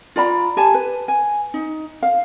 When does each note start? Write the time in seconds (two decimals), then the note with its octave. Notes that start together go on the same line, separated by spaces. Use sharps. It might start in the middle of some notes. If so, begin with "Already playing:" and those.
0.16 F4 D5 A#5 B5
0.57 G4 G#5 A5
0.74 B4
1.08 G#5
1.54 D#4
2.03 F5